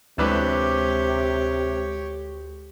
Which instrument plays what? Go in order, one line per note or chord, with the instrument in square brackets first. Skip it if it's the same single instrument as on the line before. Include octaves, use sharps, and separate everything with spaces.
[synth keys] D2 G#3 [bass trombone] C3 [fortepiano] E3 D4 B4 [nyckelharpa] G4 C#5